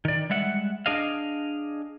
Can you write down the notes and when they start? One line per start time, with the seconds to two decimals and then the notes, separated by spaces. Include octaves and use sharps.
0.05 D#3 D5
0.30 G3 G#3 E5 F#5
0.86 D4 G#4 D#5 F5